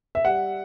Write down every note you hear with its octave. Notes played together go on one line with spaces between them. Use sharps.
E5
G3 F#5